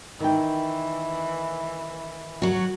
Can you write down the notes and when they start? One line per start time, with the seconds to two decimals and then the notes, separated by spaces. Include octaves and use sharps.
0.20 D#3 E3 G5
2.42 F#3 F#4